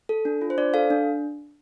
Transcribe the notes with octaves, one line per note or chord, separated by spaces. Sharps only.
A4
D4
F4
C5
D4 D5
A4 F5
D4